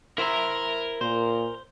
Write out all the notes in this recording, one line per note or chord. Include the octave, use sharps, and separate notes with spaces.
E4 A#4 C5 E5 A#5
A#2 C5